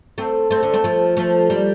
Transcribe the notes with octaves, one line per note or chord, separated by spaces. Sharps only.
A3 C4
A3 C4
D3
A3 C4
F3 A3
F3 A3
G3 A#3